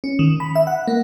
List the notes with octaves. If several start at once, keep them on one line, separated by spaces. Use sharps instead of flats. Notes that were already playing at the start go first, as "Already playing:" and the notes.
C#4
D#3
B5
E5
F#5
A#3